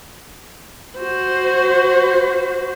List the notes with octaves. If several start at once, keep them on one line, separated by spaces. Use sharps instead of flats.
F#4 C5